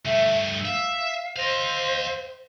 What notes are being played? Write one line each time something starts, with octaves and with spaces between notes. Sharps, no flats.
G2 A3 E5
E5 F5
C5 D#5 F5